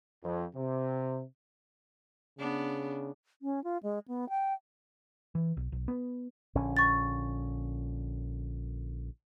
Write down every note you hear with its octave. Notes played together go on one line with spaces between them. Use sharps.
F2
C3
C#3 B3 D4
C#4
F4
G#3
B3
G5
E3
B1
B1
B3
A#1 D3 C#4
C#6 A6